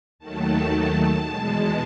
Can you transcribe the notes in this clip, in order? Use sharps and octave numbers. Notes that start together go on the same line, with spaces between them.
D#2 D#3 F#3 A3 A5
E2 B2 G#3